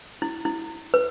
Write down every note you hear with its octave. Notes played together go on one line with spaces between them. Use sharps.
E4
E4
B4